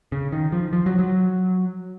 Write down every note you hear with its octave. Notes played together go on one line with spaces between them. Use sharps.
C#3
D#3
F3
F3
F#3
F#3